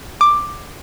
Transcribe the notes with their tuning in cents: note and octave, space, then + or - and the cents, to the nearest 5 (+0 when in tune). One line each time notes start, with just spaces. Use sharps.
D6 +10